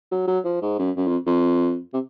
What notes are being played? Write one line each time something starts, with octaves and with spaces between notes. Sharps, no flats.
F#3
F#3
F3
G#2
F#2
F#2
F2
F2
C3